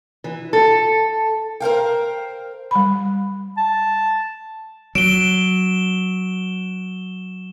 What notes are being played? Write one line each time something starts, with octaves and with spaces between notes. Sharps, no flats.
E3
A4
A#4 C5 F5 G5
G3 B5
A5
F#3 D7 E7 G7